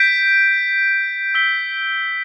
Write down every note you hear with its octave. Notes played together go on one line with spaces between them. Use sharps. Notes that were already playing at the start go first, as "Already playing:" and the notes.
Already playing: G6 B6 D7
E6 B6 G7